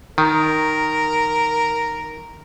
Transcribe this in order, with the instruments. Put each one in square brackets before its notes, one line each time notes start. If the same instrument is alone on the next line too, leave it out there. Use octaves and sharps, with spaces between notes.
[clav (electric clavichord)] D#3 [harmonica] A#4